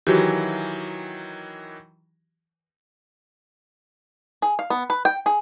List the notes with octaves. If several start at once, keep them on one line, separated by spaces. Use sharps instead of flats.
D#3 E3 F#3 F#4 G4
G#4
F5
B3
B4
G5
G#4